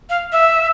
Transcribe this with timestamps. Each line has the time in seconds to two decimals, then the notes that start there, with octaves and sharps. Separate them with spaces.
0.10 F5
0.32 E5